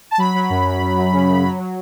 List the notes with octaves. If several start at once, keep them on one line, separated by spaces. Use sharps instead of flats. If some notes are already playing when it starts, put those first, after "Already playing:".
A5
F#3 B5
F#3
F#2
F#2
F#2
F#2
C#3
F#2
F#3
F#3